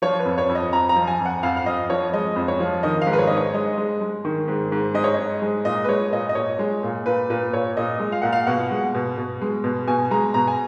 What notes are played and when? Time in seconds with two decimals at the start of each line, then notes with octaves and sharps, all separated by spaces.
0.02 F3 C#5
0.19 B4
0.25 F2
0.38 C#5
0.49 F2
0.55 D#5
0.72 F2 A#5
0.89 A#5
0.96 F3
1.07 G#5
1.19 F2
1.25 F#5
1.43 F2 F5
1.57 F5
1.66 F2 D#5
1.90 F3 C#5
2.13 G#3 D#5
2.36 F2
2.48 C#5
2.60 F3
2.83 D#3 D#5
3.02 F5
3.07 G#2
3.13 B4
3.19 C#5
3.27 D#5
3.31 G#2
3.37 C#5
3.54 G#3 D#5
3.78 G#3
4.01 G#3
4.25 D#3
4.48 G#2
4.72 G#2
4.94 G#2 D#5
5.04 C#5
5.14 G#2 D#5
5.42 G#3
5.65 A#2 D#5
5.84 B4
5.88 G#3 C#5
6.12 A#2 D#5
6.29 D#5
6.35 A#2 C#5
6.59 G#3
6.83 A#2
7.06 A#2 B4
7.30 A#2 B4
7.53 A#2 C#5
7.77 A#2 D#5
7.99 G#3
8.12 F5
8.22 A#2 F#5
8.33 F5
8.47 B2 F#5
8.71 G#3
8.95 B2
9.18 B2
9.42 G#3
9.64 B2
9.87 B2 G#5
10.11 G#3 A#5
10.34 B2 A#5
10.47 G#5